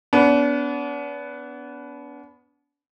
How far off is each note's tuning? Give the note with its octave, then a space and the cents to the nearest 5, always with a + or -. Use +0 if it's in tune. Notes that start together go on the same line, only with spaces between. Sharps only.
B3 +0 D4 -40